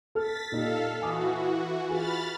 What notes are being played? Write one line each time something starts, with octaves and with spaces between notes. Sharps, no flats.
A4 F6 A6 B6
A#2 D#4 G4 A4 F5
E3 F#4 G#5 D6 D#6
F4 G#4 G#5 B5 F6 A6